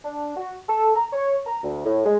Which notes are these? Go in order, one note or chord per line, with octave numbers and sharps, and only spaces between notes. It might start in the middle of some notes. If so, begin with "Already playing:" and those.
D4
F#4
A4
A#5
C#5
A#5
D2
A2
G#3